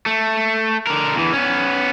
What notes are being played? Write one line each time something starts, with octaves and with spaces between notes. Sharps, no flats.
A3
D3 A#4
E2 E3
B3 C#4